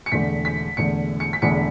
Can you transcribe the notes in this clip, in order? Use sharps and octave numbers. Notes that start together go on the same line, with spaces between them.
C#7
E1 E2 D3 A3 B6
B6
E1 E2 D3 A3 C#7
C#7
B6
E1 E2 D3 A3 C#7